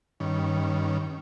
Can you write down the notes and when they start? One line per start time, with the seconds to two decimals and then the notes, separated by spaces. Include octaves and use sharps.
0.20 G2 D#3 C#4